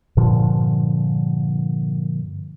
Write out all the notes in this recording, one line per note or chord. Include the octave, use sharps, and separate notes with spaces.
G2 A#2 D3 F3